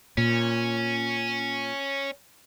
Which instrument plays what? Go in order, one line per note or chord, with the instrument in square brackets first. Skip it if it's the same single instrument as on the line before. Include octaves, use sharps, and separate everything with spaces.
[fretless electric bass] A#2 [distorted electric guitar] C#4